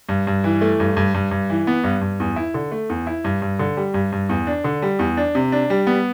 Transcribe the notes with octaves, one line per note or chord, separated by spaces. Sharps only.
G2
G2
E3
A3
G2
G2
G2
G2
E3
B3
G2
G2
E2
E4
D3
A3
E2
E4
G2
G2
D3
G3
G2
G2
E2
D4
D3
G3
E2
D4
C3
D4
G3
B3